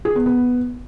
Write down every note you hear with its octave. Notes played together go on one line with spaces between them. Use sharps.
G#4
B3
B3